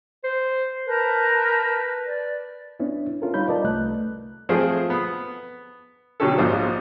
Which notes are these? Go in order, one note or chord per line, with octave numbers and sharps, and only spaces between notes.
C5
A#4 B4 A5 G6
D5
B3 C#4 D4 E4
C#4 E4 F4 A4 A#4
G3 D#4 F4 C#5 B5 G6
A#4 B4 D5 D#5 A5
C2 A3 F#6
F3 A3 C4 G#4 C5
B3
B2 D3 F#3 C#4 G4 A4
A#1 G#2 F4 C5 D#6